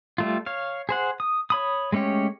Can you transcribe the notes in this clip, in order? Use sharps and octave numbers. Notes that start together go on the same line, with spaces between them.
G3 A3 F4
C#5 F5
G#4 C5 F#5
D#6
C#5 B5 D#6
G#3 A3 C#4 G4 C#5